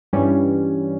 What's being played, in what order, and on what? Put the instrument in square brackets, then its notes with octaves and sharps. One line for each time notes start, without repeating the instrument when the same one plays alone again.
[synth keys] G2 E3 G3 C#4